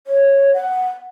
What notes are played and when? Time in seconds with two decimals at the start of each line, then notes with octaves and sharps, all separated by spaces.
0.07 C#5
0.54 F#5